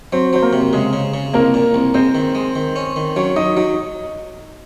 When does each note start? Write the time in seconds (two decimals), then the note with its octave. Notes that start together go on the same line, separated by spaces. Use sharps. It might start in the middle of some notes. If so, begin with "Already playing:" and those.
0.12 F#3 C4 C5
0.33 F#3 C5
0.42 A#3 A#4
0.53 C3
0.73 C#3 G#3 G#4
0.93 C#3
1.14 C#3
1.33 C2 A#3 A#4
1.54 A#2
1.74 C2
1.94 G#3 C4 C5
2.15 D#3
2.35 G#3
2.56 D#3
2.76 C#4
2.96 D#3
3.16 F#3 C#4 C#5
3.36 F#3 D#4 D#5
3.57 F#3 D#4 D#5